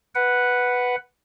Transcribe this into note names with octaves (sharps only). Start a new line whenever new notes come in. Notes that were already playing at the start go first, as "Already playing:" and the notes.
B4 F#5